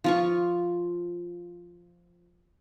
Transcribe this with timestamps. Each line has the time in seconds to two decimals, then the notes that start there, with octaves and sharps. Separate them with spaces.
0.04 F3 F4 C#6